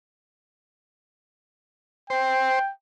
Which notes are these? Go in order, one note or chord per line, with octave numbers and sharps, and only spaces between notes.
C5 G5